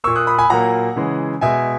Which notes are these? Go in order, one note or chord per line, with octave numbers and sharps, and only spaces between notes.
A#2 A#3 C#6 E6
D#6 F#6
B5 D#6
G#5 B5
A#2 F#3 A#3 F#5 A#5
C#3 E3 G#3
B2 G#3 E5 G#5